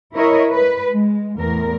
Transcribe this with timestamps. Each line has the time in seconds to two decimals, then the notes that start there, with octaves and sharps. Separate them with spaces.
0.15 E4 A#4 C#5 D#5 E5
0.53 B4
0.89 G#3
1.38 E2 A2 A#4